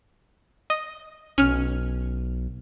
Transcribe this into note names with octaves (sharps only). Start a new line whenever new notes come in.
D#5
B1 C#4 F6